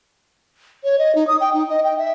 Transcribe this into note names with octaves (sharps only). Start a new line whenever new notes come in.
C#5
D#5
D#4
D#6
G5
D#4
D#5
G5
E5